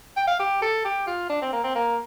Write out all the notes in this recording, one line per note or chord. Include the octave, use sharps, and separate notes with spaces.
G5
F5
G4
A4
G4
F4
D4
C4
A#3
C4
A#3